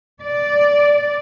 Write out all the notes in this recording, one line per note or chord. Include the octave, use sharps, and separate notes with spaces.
D5